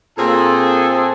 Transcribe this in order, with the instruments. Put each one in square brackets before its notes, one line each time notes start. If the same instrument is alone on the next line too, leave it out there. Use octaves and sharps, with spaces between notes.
[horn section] A#2 A#3 C4 G#4 A4